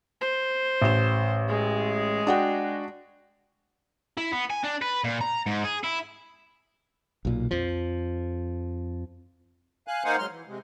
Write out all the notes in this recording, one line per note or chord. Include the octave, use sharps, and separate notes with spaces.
C5
A1 E7
G#3 G#4
D4 F#4 G5
E4
B3
G#5
D4
B4
A#2
A#5
G#2
G#4
E4
B1 A#2
F2 F3
F5 G#5 F#6
A#3 D#4 C5 F5 F#5 G#5
F#3 G#3 C6 F6
E3
C3 G#3